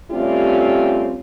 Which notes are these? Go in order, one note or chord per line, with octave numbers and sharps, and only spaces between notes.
G3 A3 C4 C#4 F4 G4